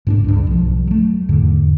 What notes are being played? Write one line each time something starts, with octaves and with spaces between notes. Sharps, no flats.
G#2 C#4 D4
C#2 G2
B1 F3
F#3 A3
E2 G#2 D3